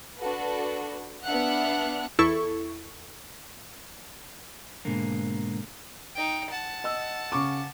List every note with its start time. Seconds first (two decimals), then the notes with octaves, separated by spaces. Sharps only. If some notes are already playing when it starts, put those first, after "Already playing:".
0.19 D4 F#4 A4 B4
1.24 B3 D4 E5 F#5 F6 F#6
2.19 E2 E4 A4 C#6
4.85 G#2 B2 D3 A#3
6.15 D#4 G5
6.50 F#5 A5
6.84 D#5 E6
7.32 C#3 C#6 D6